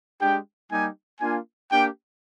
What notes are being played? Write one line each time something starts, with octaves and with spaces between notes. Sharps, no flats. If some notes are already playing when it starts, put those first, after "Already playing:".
G#3 D4 G4 G5
G3 A#3 D#4 G4 G#5
A#3 D4 F4 G#5
A#3 D4 G4 G5